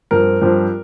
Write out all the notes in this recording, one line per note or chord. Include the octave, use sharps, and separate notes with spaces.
G2 F3 C4 A#4
G2 F3 C4